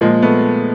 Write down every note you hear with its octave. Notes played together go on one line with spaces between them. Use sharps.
A#2 F3 G#3 A#3
A3 B3